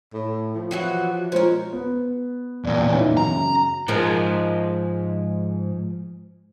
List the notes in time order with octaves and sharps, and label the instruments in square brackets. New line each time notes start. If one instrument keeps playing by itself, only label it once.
[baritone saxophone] A2
F3
[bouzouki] E3 F#3 F#4
[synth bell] G#3 F4 C5 [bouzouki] C#4 A#4
[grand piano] B3
[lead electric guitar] E2 A#2 [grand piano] D5
[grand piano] E3 C#4 D#4
[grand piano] F#2 C#3 [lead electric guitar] A#5
[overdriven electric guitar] G#2 [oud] F3 G#3 A#4